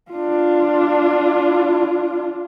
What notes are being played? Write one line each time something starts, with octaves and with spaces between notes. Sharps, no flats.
D4 F4